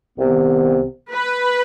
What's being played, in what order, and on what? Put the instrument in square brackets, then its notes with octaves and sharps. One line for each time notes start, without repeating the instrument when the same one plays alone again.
[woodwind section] C2 C3 D#3 B3
[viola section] B4